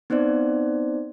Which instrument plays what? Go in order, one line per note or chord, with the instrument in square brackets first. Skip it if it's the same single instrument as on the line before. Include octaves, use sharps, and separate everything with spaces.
[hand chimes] B3 C4 D#4 C5 D5